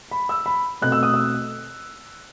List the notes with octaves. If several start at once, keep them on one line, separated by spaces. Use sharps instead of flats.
B5
E6
B5
B2 A3 C4 F#6
E6
D#6
E6